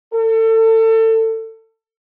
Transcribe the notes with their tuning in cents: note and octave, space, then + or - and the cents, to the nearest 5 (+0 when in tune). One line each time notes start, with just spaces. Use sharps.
A4 +30